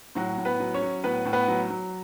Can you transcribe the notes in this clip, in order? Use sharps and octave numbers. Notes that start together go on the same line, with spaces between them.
A2 F#3 F#4
A2
B3 B4
F#3
C#4 C#5
F#3
A2 B3 B4
A2
B3 B4
F#3
F#3